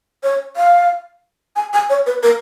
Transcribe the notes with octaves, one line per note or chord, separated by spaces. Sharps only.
C#5
F5
G#5
G#5
C#5
B4
A#4